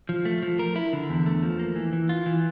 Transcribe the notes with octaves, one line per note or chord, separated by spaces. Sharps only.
F3
A3
F3
A#4
E4
D3
E2
A3
F3
A#3
E3
E3
F4
E3